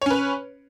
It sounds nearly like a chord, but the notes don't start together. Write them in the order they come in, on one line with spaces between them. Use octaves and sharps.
C#5 C#4 B4